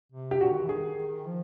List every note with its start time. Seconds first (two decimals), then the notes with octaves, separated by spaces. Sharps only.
0.12 C3
0.31 G4
0.41 A#2 F#4
0.51 D3
0.55 D#3
0.63 E3
0.69 D#3 G#4
1.26 F3